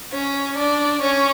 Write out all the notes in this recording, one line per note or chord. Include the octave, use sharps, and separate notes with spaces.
C#4 C#5
D4 D5
C#4 C#5